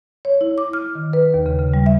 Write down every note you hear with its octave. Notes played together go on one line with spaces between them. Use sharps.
C#5
E4
D6
F6
D#3
B4
D#2
C#3
C#3
G3
E5